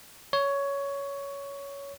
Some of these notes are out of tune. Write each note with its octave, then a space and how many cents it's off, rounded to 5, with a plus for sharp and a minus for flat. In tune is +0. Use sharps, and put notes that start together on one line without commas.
C#5 +15